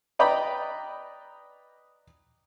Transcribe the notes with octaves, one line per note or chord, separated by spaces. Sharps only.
B4 D5 D#5 G5 A#5 B5